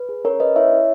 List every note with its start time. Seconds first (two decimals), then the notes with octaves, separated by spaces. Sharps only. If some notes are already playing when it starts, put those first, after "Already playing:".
Already playing: B4
0.09 G#4
0.24 C#4 A#4 C#5
0.40 C#4 B4 D#5
0.56 E4 C#5 E5
0.72 E4